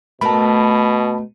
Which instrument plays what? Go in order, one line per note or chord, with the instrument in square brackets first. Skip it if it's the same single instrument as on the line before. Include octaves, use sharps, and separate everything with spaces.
[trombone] B2 [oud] A3 A#4 [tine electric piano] A5 B5